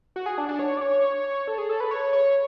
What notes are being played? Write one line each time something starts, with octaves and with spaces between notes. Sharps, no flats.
F#4
G#4
D4
D4
C#5
D5
C#5
A4
G#4
A4
B4
C#5
C#5